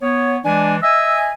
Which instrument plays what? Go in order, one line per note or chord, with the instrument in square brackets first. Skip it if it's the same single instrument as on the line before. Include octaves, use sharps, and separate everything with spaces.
[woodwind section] B3 C#5
[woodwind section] E3 G#3 D4 [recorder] G#5
[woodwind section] D#5 E5 G#5 [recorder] E6